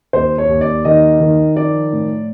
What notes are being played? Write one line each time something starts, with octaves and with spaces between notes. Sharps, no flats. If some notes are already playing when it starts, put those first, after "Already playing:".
D#2 C5
C#5
D#2
D5
D#3 D#5
D#3
F3 D5
A2